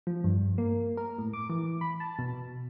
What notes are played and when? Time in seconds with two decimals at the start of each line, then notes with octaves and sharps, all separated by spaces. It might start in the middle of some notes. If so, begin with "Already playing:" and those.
0.07 F3
0.24 G2
0.58 A#3
0.97 A#4
1.19 A2
1.33 D6
1.50 E3
1.81 B5
2.00 A5
2.19 B2